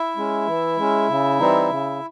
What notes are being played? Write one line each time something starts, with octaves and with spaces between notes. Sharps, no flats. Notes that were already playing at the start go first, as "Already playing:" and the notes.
Already playing: E4 E5
G#3 C#4
E3
G#3 C#4
C#3
E3 G3 C4 D#4
C#3